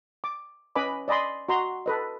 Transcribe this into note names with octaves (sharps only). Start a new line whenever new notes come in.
D6
C#4 B4 D#5 G#5 B5 D6
D5 D#5 G#5 B5 C6
F#4 D#5 A#5 C6
A4 B4 D#5